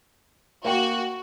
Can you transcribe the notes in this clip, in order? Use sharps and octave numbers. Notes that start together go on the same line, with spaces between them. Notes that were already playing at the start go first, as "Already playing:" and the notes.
A#3 F#4 G5